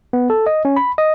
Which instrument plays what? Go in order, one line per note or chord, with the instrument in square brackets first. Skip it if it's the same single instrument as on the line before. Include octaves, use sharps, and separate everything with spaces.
[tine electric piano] B3
A4
D#5
C#4
B5
D#5